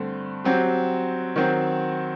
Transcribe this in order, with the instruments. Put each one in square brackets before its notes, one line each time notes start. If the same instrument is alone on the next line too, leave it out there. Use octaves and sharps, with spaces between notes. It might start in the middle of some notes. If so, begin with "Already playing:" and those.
Already playing: [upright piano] G2 D3 A3 C4
F#3 C4 G4
D#3 F#3 C4